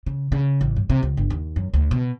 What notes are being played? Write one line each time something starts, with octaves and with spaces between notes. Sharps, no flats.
C#3
C#3
A1
G2
C3
C#2
G1
D#2
F#2
D2
B2